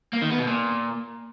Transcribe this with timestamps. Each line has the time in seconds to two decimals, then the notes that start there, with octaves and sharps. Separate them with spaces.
0.13 A#3
0.22 D#3
0.30 B3
0.39 B2
0.47 A#2